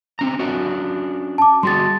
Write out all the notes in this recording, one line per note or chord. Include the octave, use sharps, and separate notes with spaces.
C4 C#4 A#5
C#4 D4 F#4
A5 D6
G3 F#4 G#4 C6 A6